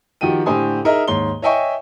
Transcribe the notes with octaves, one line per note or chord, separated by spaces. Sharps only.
D#3 F3 F#4 G4 G5 D#7
A2 D3 G4 C5 G#5 D#6
D#4 G#4 A#4 D#5 E5
D#2 G#2 C#5 C6 G7
C#5 D#5 E5 G5 G#5 C#6